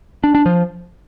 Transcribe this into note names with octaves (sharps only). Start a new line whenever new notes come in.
D4
D4
F3